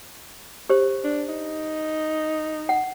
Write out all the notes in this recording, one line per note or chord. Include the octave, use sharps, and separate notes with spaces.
G4 C5
D4
D#4
F#5